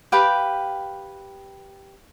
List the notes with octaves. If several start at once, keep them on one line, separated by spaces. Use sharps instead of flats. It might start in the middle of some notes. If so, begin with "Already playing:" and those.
G4 B4 F5 G5